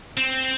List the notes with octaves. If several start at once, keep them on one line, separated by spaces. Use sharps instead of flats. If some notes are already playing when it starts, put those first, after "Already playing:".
C4